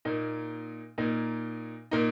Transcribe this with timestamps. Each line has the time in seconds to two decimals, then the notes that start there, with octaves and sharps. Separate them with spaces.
0.05 A#2 A#3 D#4
0.98 A#2 A#3 D#4
1.91 A#2 A#3 D#4